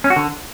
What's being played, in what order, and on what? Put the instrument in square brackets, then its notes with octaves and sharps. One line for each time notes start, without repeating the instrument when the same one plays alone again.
[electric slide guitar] C#4
F#4
D3